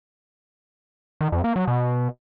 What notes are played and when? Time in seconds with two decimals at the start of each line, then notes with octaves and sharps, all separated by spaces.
1.21 D#3
1.32 F2
1.44 A#3
1.56 F#3
1.67 B2